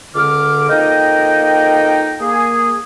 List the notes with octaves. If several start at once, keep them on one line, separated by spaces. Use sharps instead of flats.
C#2 D3 D6 F6
F2 A#3 D#4 D#5 G5
A#3 G#4